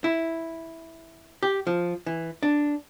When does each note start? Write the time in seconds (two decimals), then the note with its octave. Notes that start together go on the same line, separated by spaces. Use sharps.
0.04 E4
1.43 G4
1.67 F3
2.06 E3
2.43 D4